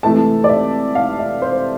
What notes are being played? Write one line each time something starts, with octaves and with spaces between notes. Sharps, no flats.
C3 E3 A3 E4 A5
D5
E5
F5
E5
C5